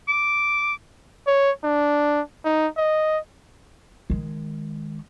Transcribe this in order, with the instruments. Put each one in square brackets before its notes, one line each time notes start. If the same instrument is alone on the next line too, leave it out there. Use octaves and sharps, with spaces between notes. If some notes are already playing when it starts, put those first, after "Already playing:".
[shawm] D6
[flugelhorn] C#5
D4
D#4
D#5
[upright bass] D#3 G#3